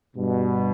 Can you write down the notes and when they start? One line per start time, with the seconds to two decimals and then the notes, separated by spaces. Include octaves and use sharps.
0.16 G2 B2